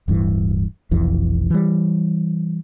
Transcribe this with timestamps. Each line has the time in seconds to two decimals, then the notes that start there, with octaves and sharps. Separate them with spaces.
0.08 D1 G2 E3
0.91 F1 B1 F2 E3
1.50 E3 G3